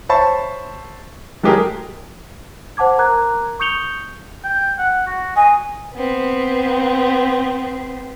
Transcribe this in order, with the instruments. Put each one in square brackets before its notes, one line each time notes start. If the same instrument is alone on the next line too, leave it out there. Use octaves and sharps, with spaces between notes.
[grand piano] C5 C#5 E5 A5 B5 C#6
F#3 G#3 A3 G4 G#4 A#4
[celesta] C5 F#5 A5 D6 G#6
A#4 A#5 D6 F#6 G#6
C#6 D#6 G6 C#7 F7 G7
[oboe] G5
F#5
F#4
[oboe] D#5 [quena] G#5
[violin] B3 C4